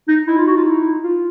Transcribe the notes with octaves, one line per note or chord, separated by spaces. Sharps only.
D#4
D#4 E4
F4
F#4
F4
E4
F4